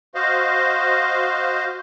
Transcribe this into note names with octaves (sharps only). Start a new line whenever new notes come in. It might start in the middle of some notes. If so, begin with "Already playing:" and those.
F#4 C5 D#5 F5